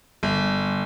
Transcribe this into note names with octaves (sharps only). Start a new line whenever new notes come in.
G1